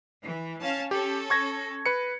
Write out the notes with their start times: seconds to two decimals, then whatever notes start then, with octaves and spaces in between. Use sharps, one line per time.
0.25 E3
0.61 C#4 F5 A5
0.91 C#4 G4 A4
1.30 C#6 G#6 A#6
1.86 B4 C#7